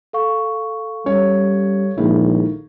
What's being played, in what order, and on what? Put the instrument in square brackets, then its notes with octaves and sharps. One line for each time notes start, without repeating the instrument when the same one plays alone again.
[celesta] A4 F5 C#6
[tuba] G3 [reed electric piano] C#4 [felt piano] C#5
[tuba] A#1 [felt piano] D#3 [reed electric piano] G#3 A#3 E4